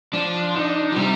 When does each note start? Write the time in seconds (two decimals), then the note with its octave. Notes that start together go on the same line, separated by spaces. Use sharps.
0.13 F3 D4
0.55 D#4
0.92 F3
0.96 C3 G3